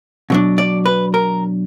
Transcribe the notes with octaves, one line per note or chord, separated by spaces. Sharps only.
B2 F#3 D4
D5
B4
A#4